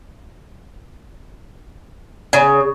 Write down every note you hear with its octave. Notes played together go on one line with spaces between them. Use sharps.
C#3